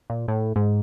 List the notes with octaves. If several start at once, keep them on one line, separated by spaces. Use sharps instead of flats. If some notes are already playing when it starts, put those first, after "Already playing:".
A#2
A2
G#2